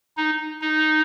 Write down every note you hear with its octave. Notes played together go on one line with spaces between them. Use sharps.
D#4
D#4